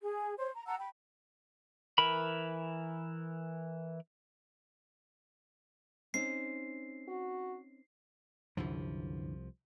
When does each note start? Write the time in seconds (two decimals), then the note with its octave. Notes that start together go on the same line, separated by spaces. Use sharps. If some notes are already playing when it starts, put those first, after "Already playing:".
0.02 G#4
0.38 C5 C#5
0.53 A#5
0.66 F#5 A5 A#5 E6
0.79 G5 B5
1.98 E3 A#4 B5
6.14 C4 C#4 D#4 C7
7.08 F#4
8.57 C2 F#2 D3 E3 F3